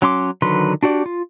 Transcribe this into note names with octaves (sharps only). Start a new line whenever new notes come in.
F#3 C#4 C6 D6
D3 D#3 F#3 B4 C6
D4 F#4 G4 D5
F4